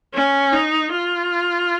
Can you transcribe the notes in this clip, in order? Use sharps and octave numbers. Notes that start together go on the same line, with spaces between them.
C#4
D#4
F4